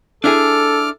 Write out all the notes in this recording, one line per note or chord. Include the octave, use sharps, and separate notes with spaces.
D4 E4 G#4 A4 D6 F6